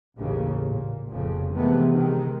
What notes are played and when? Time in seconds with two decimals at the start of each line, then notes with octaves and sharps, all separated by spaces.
0.17 A1 D#2 C#3
0.68 A#2
1.08 F1 F2 A#2 C#3 F3
1.52 C3 D#3 E3 G#3 A3 B3
1.93 C3 D#3 G#3